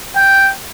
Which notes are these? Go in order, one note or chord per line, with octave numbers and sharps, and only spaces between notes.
G5